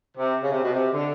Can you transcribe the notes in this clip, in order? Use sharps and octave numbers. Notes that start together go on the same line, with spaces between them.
C3
C#3
C3
B2
C3
D3